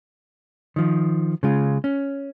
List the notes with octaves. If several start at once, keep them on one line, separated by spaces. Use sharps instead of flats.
D#3 F3
C#3 G#3 F4
C#4